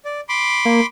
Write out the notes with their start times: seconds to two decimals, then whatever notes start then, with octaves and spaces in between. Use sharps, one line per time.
0.05 D5
0.29 B5 C6 D6
0.65 A#3